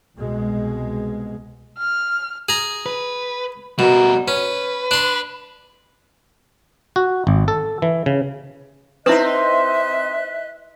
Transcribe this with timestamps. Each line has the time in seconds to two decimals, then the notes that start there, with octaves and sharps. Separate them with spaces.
0.16 C2 B2 G#3
1.78 F6
2.49 G#4 A#5
2.86 B4
3.79 B2 G3 A#4
4.28 C#4 B4
4.91 D4 C6
6.96 F#4
7.27 G#1
7.48 A4
7.82 E3
8.06 C#3
9.06 C4 D#4 E4 B4 D#5 E5 F#6